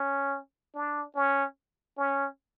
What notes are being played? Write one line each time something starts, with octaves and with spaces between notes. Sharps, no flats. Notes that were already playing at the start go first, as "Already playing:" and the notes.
Already playing: C#4
D4
C#4
C#4